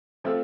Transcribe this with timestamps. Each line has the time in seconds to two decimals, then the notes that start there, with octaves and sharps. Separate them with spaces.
0.24 F3 A3 C4 F4 A4